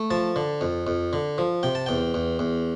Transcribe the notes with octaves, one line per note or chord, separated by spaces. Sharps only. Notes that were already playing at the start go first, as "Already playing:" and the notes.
Already playing: A3
F3 A5
D3
F2
F2
D3
F3
C3 G5
A5
E2 G5
E2
E2